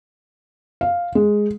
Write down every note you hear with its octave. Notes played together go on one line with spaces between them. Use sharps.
F5
G#3